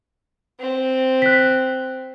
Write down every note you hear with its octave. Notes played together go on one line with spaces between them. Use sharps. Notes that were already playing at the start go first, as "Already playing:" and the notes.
C4
F#6 B6